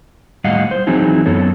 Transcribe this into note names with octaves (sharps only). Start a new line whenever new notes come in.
A2 G3 D#5 F5 F#5
C5
E3 F#3 C4 D#4 E4 G#4
F#2 B3 A4 C#5